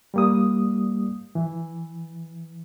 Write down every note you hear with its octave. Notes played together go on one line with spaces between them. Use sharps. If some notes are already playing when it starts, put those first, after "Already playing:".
G3 A#3 D#6
E3